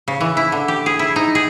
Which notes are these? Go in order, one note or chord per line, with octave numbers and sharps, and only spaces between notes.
C#3
E3
E4
D3
G4
G#4
E4
D#4
G#4